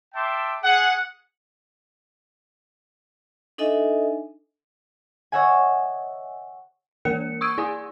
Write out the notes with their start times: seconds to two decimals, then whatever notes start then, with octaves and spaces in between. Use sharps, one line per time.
0.15 E5 G5 A5 C6 D6
0.63 G#4 F#5
3.58 D4 D#4 A4 D#5 E5 G#5
5.32 C#5 D#5 E5 F#5 G#5
7.05 E3 A#3 A#4 C#7
7.41 C#6 D#6 E6 G#6 D7 D#7
7.58 E4 D5 G#5 D#6